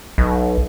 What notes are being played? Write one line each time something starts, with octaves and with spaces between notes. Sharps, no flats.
B1